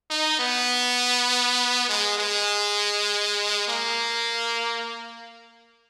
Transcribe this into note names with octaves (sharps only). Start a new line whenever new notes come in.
D#4
B3
G#3
G#3
A#3